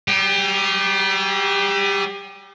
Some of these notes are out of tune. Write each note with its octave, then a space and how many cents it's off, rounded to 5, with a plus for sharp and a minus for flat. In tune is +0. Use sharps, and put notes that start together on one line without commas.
G3 -40 G4 +30